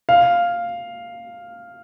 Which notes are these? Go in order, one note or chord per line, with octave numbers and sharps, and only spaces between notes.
F5